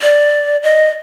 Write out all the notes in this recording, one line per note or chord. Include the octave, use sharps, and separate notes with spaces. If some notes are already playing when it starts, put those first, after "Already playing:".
D5
D#5